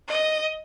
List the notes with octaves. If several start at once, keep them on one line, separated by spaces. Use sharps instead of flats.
D#5